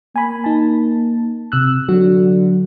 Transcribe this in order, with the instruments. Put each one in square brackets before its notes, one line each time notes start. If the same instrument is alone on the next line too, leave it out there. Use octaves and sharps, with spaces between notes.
[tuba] A#3 [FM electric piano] G#5 B5
[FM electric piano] D#4 A5
C3 E6 F#6
[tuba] D3 [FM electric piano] F#3 F#4